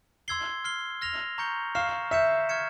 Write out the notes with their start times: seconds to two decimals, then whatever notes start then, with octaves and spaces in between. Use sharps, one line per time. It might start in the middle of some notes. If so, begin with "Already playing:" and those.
0.28 C6 E6 G#6 C7 G7
0.64 F6 C7 G7
1.01 F6 A#6 F7
1.38 A#5 C#6 G6 C#7 G7
1.75 F5 A#5 C#6 F6 C7 E7
2.11 E5 G6 C#7 E7
2.49 C#6 F6 G#6 C#7 E7